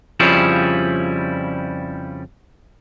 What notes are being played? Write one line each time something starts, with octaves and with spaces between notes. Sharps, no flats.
F2 C#3 F3 G3 C#4 E4